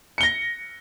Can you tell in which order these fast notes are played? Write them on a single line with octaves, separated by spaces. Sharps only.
C#7 G7 A#6